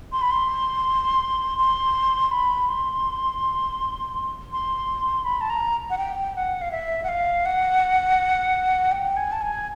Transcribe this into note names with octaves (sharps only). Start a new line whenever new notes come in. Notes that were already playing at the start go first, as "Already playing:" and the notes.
C6
B5
C6
C6
B5
C6
C6
B5
A5
A#5
F#5
G5
F#5
F5
E5
F#5
F5
F#5
G5
G#5
A5
G#5